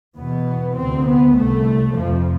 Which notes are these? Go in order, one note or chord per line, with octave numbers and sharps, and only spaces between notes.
E2 B2 B3
D2 C3 C4
B3
C2 C3 A3
F2 C3 F3